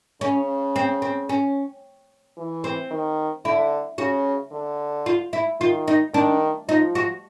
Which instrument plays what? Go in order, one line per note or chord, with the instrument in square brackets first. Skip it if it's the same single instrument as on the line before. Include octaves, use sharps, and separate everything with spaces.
[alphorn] C#3 [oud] C#4
[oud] C4
C4
C#4
[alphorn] E3
[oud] C4
[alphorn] D#3
[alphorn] D3 [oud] E4
[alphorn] C#3 [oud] F#4
[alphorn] D3
[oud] F4
E4
[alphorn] D#3 [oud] F4
[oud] D#4
[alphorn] D#3 [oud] D4
[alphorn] F3 [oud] D#4
[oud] F#4